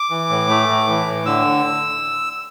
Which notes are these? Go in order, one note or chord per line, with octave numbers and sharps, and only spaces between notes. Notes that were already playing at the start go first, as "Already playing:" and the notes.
Already playing: D6
E3
A2
A3
A2
E3
A2
D3 E6